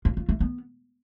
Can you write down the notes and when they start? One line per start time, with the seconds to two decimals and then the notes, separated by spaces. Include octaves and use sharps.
0.05 F4
0.17 F4
0.29 A3
0.40 B3